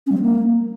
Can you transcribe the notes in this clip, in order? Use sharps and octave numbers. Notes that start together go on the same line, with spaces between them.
C#4
G3
C4
A#3